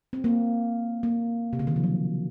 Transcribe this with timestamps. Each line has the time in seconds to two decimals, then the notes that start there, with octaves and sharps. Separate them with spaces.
0.13 C4
0.24 A#3
1.03 A#3
1.53 C3
1.59 C#3
1.67 D#3
1.76 F3
1.84 F#3